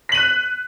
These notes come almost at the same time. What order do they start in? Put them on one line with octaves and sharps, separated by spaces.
B6 F#7 D#7 F#6